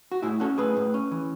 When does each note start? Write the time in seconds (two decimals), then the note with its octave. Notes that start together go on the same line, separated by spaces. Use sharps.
0.12 F#4
0.22 A2 E4 G#4
0.40 C#4 F#4 A4
0.58 A2 G#4 B4
0.77 A2
0.94 C#4
1.11 E3